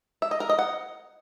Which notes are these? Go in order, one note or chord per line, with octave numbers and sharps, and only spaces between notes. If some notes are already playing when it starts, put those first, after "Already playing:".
E5
D#5
A#4
D#5
F#5